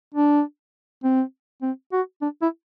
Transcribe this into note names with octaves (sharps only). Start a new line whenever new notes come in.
D4
C4
C4
F#4
D4
E4